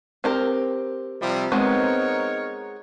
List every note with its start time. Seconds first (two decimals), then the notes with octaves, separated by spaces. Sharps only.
0.24 C4 G4 A#4
1.21 C3 F3 G3
1.52 G#3 B3 C4 D#4 A#4 C#5